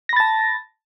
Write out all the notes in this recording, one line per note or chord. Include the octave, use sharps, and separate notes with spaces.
A5 B5 A6 A#6